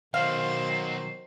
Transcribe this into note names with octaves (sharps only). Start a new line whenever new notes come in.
B2 D#3 F#3 D#4 C5 F5